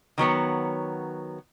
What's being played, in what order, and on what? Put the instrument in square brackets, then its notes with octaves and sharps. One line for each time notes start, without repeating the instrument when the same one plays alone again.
[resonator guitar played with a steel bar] D#3 F#3 B3 C#5